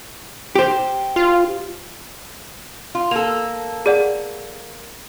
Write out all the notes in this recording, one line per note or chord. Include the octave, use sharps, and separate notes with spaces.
G4 C5
F4
F4
A#3 A4 F7
G#4 D5 F#5